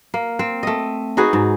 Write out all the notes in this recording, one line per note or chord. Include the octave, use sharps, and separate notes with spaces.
A#3
C4
A3 D#5
D#4 F#4 G#4 B4
G#2